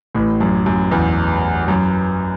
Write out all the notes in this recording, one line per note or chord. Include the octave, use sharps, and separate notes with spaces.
A1 A2
F#2
F#2
E2
F#2